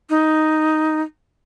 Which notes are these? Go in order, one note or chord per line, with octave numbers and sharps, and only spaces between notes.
D#4